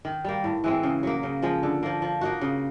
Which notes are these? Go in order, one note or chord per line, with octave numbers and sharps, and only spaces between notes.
D#3
G3 A#3
A2
E3 G#3 C4
C#3
F#3 A#3
C#3
F3 G#3
D3
F3 A#3
F3
A#3 D#4 F#4
C#3